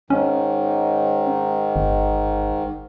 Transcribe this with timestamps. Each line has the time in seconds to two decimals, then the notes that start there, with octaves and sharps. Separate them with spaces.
0.10 G#2 D#3 C#4
1.76 G1